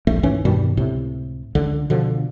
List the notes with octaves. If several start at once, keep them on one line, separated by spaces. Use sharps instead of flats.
D1 A#1 F2 A3
C#2 G#2 E3 C#4
G2 B2 D#3 G3
C#2 A2 C3
C#2 D3
B2 D3 F3